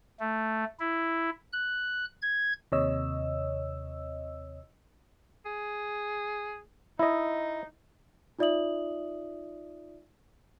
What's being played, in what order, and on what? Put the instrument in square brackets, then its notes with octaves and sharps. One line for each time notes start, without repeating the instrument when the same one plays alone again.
[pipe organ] A3
E4
F#6
G#6
[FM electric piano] D#2 C3 C#5 D#5 E6
[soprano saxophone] G#4
[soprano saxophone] D#4 [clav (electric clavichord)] E4 D#5
[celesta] D#4 F4 D5 E5 D#6 F#7